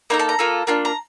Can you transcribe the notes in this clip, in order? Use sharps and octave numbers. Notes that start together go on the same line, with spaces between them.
A#3 D#4 A4 A#5
A5
A#5
A#3 F4 A4
A#3 D4 F4
A#5